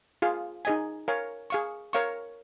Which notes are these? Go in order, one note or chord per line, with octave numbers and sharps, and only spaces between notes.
F4 G#4 F5
D#4 G#4 D#5 G#5
A#4 C#5 F5 G#5
G#4 F5 C#6
A#4 C#5 F5 C#6